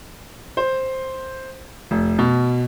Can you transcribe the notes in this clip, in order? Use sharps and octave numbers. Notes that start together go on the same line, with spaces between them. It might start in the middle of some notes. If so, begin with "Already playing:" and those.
C5
F1
B2